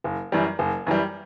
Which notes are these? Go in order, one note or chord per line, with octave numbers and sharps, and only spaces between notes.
F#1
F#2 E3 G3
F#1
F#2 E3 G3